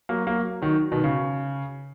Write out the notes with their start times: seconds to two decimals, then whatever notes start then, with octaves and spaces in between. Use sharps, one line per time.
0.09 F#3 A#3
0.27 F#3 A#3
0.62 D#3 F#3
0.91 B2 D#3
1.04 C#3